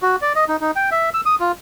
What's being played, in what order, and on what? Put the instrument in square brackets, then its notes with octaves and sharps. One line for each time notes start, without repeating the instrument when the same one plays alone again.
[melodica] F#4
D5
D#5
D#4
D#4
G5
E5
E6
D#6
F4